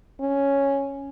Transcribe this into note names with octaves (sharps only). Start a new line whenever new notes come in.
C#4